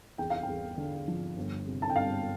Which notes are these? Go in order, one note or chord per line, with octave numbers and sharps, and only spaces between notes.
E2 G5
F5
G5
E2
D3
F3
G1
C3
A5
G5
G1 F5